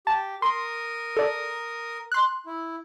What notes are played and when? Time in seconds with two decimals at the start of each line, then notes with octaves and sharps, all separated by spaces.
0.07 G4 A5
0.42 A#4 C6 D#6
1.17 A4 D5
2.12 C6 F#6
2.46 E4